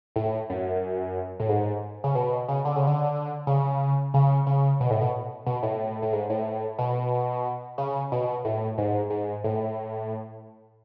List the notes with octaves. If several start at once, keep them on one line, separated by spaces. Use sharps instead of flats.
A2
F#2
A2
G#2
C#3
B2
C#3
D3
C#3
D3
C#3
C#3
C#3
B2
A2
B2
B2
A2
A2
G#2
A2
B2
C#3
B2
A2
G#2
G#2
A2